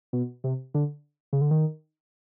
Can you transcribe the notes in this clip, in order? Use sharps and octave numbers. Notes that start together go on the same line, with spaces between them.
B2
C3
D3
C#3
D3
D#3